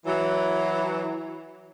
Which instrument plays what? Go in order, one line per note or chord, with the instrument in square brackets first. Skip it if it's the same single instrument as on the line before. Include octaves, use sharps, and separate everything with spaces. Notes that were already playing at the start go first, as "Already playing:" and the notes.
[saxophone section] E3 F#3